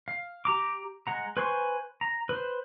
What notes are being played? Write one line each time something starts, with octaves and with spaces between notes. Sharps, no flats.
F5
G4 A#5 D6
G#3 F#5 A#5
B4 C5 G#5 C6 C#6
A#5
B4 C5